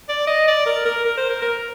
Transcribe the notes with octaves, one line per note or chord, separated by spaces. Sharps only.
D5
D#5
D5
A#4
A#4
A#4
C5
A#4
A#4